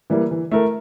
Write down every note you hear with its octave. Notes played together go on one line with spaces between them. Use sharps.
E3 G3 A#3 E4
E3
A3 E4 A#4